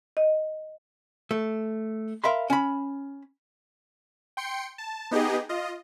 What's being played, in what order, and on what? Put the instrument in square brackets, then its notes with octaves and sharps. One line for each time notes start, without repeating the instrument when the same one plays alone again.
[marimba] D#5
[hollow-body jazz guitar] A3
A#4 E5 F5 B5 C6
C#4 B5
[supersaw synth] G5 C6 C#7
A5
B3 D#4 G4 G#4 D#5
F4 D#5